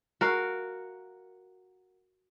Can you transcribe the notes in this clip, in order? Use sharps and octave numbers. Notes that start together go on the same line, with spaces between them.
F#4 A#4 F5